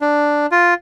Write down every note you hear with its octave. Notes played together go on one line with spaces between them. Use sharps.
D4
F4